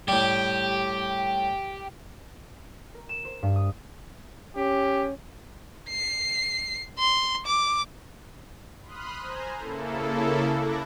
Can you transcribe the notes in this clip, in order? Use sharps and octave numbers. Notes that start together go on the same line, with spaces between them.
A2 G3 G4
A#4
E7
C5
G2
D#6
C#4 G4
C7
C6
D6
B5 C6 D#6 F6 F#6
C5 G#5 A#5
C#3 A#3 E4 A4
A5 B5 D6 F#6 G#6 A#6